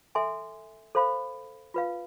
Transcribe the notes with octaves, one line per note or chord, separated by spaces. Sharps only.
A4 E5 G#5 C6
A4 C5 F5 B5
F4 B4 F5